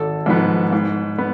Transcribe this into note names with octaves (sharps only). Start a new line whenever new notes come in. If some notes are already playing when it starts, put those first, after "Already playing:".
Already playing: G#1 A4
G#2 F3 B3
G#2
B3